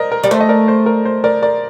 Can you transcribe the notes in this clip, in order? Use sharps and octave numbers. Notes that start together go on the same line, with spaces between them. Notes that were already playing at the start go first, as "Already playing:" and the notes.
Already playing: A#4 C5 D5 D#5
A#4
G3 D5
A3 C5
D#5
A#4 D5
C5
A#4
C5
A#4 D5
A#4 D5